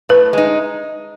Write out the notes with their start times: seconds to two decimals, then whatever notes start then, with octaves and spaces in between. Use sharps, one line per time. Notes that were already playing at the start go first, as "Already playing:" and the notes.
0.09 A2 B4
0.33 G#3 D#4